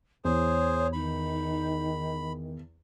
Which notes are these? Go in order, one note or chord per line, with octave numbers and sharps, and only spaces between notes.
E2 G#4 C5 C#5
D#3 D#4 B5